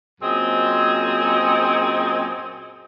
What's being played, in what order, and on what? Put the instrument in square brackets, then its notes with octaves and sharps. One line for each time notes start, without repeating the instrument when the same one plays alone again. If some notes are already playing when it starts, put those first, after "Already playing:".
[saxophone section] F#2 A#2 C4 G#4 D#5